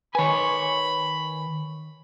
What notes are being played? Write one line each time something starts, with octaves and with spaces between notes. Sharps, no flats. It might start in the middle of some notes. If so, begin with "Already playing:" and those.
D#3 B4 C#5 G#5 B5